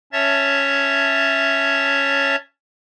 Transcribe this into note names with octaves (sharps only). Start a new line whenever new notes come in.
C#4 C#5 E5 A5 A6